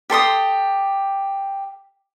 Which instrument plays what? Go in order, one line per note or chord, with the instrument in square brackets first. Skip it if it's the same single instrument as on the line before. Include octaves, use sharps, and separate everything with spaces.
[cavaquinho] G4 A4 C6 D#6